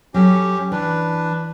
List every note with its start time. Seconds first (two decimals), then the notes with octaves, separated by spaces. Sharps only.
0.14 F#3 C#4 G4 A4
0.72 E3 D4 B4